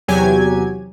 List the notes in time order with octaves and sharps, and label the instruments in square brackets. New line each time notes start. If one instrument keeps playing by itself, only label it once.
[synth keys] E2 C3 F#3 G4 G#5 G#6